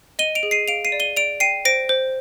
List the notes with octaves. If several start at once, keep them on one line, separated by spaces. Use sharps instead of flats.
D#5 D#7 G7
D7 F7
G#4
C7 D#7
F5 D7 F7
C7 D#7
D5
D#7 G7
D5 D7 F7
G5 C7 D#7
C5 A#6 D7
C5